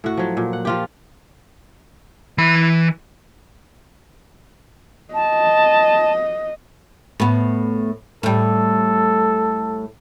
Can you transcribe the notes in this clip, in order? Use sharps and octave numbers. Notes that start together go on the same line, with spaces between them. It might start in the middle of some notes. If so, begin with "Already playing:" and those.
A2 F#4
F3 F#3
A#2
F#5
F3 F4 G4
E3 B5
D#5 A5
A2 B3
A2 G3 A4